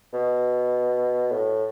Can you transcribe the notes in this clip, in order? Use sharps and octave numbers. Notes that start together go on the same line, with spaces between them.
B2
A2